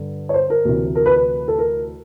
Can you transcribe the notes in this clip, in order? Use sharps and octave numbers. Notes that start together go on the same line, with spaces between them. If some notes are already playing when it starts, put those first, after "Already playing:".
Already playing: G2 D3
C#5
C5
A#4
D2 C3 E3
A#4
B4
B4
A4
A#4